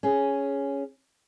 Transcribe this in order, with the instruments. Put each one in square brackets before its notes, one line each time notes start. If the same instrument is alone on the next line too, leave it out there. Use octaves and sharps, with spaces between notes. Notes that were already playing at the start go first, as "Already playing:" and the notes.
[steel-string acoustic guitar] C#4 G#4